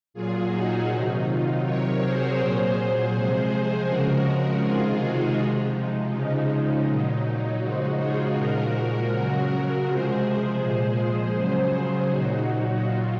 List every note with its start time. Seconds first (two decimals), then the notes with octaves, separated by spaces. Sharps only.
0.14 A#2 F#3 F4 G#4
0.51 D#4 F#4
0.88 C3 D#3 F#3 D#4
1.26 F4
1.63 C3 F#3 A#4 C#5
2.00 G#4 C5
2.38 A#2 F#3
3.13 C3 F3 G#3
3.87 C#3 F3 G#3 F#4 A#4
4.62 C3 D#3 G#3 F4 G#4
5.00 D#4 F#4
5.37 C3 F3 G#3
5.74 D#4
6.11 C#3 F3 G#3 D#4
6.86 A#2 F#3
7.61 C#3 F3 G#3 D#4 F#4
7.98 F4 G#4
8.35 A#2 F3 G#3 F#4 A#4
9.10 C#3 F#3
9.85 C3 F3 G#3 G#4 C5
10.22 G#4 C5
10.60 A#2 F3 G#3
11.34 C#3 F#3
12.09 A#2 F#3 D#4 F#4
12.84 A#2 F#3 F4